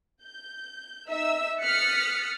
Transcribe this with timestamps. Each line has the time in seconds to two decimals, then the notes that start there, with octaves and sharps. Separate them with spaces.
0.24 G6
1.09 D#4 E5 E6
1.61 D#6 F6 F#6 A6 B6 C#7